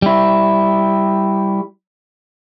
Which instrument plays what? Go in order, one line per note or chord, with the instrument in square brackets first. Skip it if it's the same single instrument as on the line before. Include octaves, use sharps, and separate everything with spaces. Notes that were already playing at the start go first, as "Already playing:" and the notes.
[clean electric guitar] G3 E4